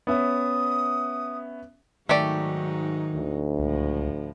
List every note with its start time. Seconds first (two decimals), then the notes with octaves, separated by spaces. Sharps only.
0.07 B3 C#4 E5 D#6
2.09 G#2 D#3 F#3 A3 D#4 G4 D5
3.15 D2
3.59 C#2 A2 F3